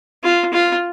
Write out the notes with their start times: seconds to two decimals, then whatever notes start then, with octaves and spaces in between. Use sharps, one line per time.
0.23 F4
0.53 F4